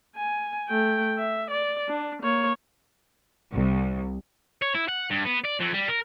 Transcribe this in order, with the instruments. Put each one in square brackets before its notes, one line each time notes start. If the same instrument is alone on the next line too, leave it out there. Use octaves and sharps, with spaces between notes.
[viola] G#5
A3 G5
E5
D5
D4
A#3 C#5
[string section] C2
[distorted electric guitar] C#5
E4
F#5
G2
B3
D5
F2
G3
A#4